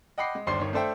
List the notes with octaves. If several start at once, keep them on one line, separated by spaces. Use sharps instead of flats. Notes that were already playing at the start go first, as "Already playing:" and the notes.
D#5 F#5 G5 B5 D6 C7
G#3
G1 D#2 D4 C5 C6 C7
G1 D#3 C#5
A3 D4 A4 C5 E5 G5